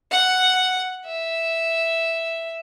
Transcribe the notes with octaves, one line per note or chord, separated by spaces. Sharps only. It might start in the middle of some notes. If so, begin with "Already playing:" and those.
F#5
E5